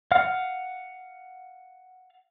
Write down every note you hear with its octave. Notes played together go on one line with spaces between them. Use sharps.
F5 F#5 F6